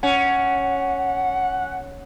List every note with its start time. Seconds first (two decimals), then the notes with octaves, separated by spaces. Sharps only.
0.03 C#4 F#5